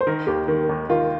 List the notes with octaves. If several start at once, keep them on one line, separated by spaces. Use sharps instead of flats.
C5
D#3 A#4
D#2 G4
D#3
D#2
D#3 F4